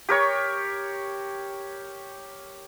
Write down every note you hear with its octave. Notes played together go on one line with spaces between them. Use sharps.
G4 A#4 C#5 C#6